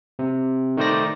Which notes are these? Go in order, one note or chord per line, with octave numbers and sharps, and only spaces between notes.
C3
D#3 A3 D#4 C5 D5 A#6